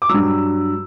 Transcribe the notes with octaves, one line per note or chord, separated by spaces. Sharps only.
D6
G2 F#3 E6